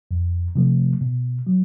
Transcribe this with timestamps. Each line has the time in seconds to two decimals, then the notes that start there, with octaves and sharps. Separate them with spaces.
0.11 F2
0.55 C3 F3 A3
1.01 B2
1.47 F#3